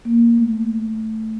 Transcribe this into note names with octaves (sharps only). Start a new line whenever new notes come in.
A#3
A3